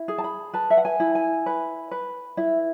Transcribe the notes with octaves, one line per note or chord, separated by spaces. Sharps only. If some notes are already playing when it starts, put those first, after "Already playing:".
Already playing: E4
G#4
A5
B5
B4 A5
E5
F#5
G#5
E4
G#5
B4
B4
E4 E5